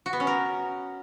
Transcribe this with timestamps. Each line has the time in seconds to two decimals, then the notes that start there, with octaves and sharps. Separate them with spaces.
0.06 F#4
0.13 B3
0.20 C#4
0.27 A#4